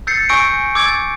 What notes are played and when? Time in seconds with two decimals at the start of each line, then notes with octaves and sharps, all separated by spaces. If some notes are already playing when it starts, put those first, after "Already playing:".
0.07 E6 G6 A6 C7 C#7
0.29 G#5 C#6 E6 G6 A#6 D7
0.75 D6 E6 G#6 A6 D7